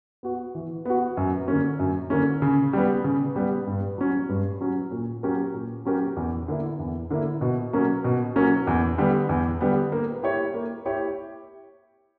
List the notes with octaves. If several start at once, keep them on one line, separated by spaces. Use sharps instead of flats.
B3 F#4
E3
B3 F#4
F#2
D3 A#3 C#4
F#2
D3 A#3 C#4
C#3
G3 B3
C#3
G3 B3
G2
F#3 C#4
G2
F#3 C#4
A#2
F#3 C#4 G4 A#4
A#2
F#3 C#4 G4 A#4
E2
D3 A#3 E4
E2
D3 A#3 E4
B2
F#3 A#3 C#4
B2
F#3 A#3 C#4
E2
D3 G3 B3
E2
D3 G3 B3
A#3
E4 G4 C#5
A#3
E4 G4 C#5